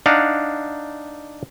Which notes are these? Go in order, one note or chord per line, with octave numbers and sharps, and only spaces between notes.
D4 D#4 F5 F#5